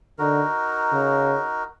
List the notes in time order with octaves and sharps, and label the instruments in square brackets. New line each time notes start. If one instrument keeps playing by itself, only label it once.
[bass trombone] D3 [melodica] D#4 F#4 A#4
[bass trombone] C#3